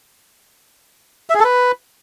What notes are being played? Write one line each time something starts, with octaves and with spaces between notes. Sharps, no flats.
E5
G#4
A4
B4